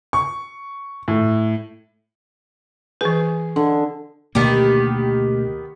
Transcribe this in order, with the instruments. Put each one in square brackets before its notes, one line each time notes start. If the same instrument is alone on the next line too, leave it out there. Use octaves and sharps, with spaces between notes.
[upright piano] C#6
A2
[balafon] E3 B4 [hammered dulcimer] G#4
[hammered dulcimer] D3
[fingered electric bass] D2 B2 A#3 [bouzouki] D#3 B3 G4